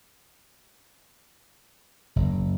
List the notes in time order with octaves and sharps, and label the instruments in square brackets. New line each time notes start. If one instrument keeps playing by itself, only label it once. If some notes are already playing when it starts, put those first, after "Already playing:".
[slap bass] F#1